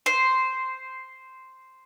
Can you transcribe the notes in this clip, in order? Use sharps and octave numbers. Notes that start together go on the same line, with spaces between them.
C5